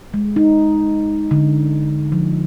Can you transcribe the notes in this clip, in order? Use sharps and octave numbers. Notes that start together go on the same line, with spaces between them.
G#3
D#4
D3
F3